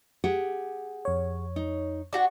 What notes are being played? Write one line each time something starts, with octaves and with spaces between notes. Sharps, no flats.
G4 G#4 F#5
F2 C#5
D#4
D4 F#4 D5 F#5